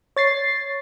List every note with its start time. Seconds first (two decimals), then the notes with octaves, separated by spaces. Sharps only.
0.16 C#5 A6 C7